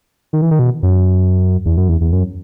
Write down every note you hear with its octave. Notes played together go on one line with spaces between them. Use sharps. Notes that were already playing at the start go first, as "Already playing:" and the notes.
D#3
E3
D#3
B2
F#2
E2
F#2
E2
E2
F#2